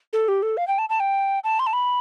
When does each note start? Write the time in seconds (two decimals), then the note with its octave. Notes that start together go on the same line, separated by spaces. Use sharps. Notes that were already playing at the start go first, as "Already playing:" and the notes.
0.13 A4
0.28 G4
0.42 A4
0.57 F5
0.67 G5
0.78 A5
0.89 A5
1.00 G5
1.44 A5
1.59 C6
1.67 A5
1.73 B5